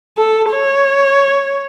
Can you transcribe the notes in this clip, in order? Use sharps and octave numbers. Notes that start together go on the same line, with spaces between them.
A4
C#5